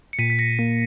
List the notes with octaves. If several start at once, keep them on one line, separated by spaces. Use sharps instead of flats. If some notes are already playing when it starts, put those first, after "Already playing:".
C#7
A#2 B6 D#7
B6
A#6 C#7
A#3